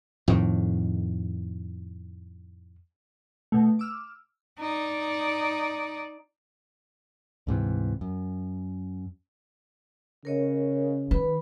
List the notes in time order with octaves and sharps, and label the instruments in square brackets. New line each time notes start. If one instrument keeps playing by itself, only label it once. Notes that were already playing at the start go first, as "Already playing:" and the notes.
[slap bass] F2 A2 D#3
[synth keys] B2 A3
D6 E6 F6
[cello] D#4 D5
[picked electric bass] D2 G#2 C3 E3
F#2
[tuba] C#3 [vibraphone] A#4 C#5 D#5
[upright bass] D#3 [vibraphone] B4 B5